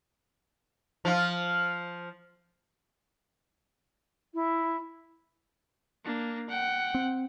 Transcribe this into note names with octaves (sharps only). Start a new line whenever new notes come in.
F3 F4
E4
A#3 D4
F#5 G5
C4